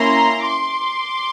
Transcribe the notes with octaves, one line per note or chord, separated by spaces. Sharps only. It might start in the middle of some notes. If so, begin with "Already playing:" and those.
Already playing: A#3 C#4 E4 A#5 C6
C6 D6